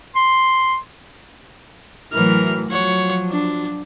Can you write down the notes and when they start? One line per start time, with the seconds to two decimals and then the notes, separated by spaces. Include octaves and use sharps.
0.16 C6
2.13 A2 E3 F#3 A#4 F6
2.70 F3 F#3 C#5 F#5
3.30 D4